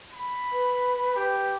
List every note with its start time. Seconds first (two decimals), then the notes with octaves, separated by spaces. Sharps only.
0.13 B5
0.52 B4
1.16 G4